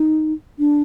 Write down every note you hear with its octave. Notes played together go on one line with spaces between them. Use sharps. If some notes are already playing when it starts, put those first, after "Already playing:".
Already playing: D#4
D4